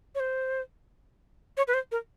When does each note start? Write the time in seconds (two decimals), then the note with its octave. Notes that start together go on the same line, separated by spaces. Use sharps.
0.15 C#5
0.20 C5
1.57 C#5
1.68 B4
1.74 C5
1.92 A#4